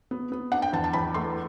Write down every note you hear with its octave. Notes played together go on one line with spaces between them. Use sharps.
B3
B3
D4 F#5
G5
E2 A5
A5
E2 B5
A3 C6